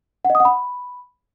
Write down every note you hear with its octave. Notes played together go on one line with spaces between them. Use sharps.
F#5
D#5
D#6
F#5
B5